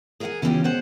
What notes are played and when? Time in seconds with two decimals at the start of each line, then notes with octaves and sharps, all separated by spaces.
0.20 G#4 A#4 C#5 F5 F#5 G#5
0.42 C#3 E3 B3 C#4 F4 G4
0.64 B2 G#4 C5 F#5